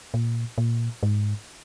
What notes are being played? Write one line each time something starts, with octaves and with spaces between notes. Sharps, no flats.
A#2
A#2
G#2